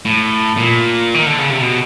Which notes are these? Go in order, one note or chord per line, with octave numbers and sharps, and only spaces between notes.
A2
A#2
D#3
D3
C#3
C3
B2